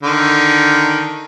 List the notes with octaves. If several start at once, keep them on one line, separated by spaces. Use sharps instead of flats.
D3 D#3